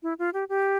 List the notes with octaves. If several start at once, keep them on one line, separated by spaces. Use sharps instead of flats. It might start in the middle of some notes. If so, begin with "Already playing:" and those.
E4
F4
G4
G4